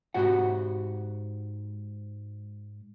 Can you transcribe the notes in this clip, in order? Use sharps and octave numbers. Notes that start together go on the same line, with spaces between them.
G#2 F#4 G4 F#5